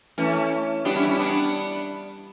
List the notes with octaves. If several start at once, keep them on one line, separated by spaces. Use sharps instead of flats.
E3 A3 C#4
G3 B3 D4
C#4 E4
C#4 E4
B3 D4